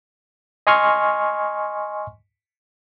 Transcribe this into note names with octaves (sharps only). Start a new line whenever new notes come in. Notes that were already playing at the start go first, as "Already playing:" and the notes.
D#5 G#5 C6 C#6 F6